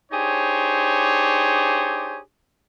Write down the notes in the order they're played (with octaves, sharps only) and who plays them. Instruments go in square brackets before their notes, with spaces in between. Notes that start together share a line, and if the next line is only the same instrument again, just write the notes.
[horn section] D4 D#4 G4 G#4 C5 C#5